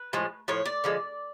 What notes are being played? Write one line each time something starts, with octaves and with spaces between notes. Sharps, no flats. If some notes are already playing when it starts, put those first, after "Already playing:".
Already playing: B4
A2 F3 G#3
A2 F3 C#5
D5
D3 F3 G#3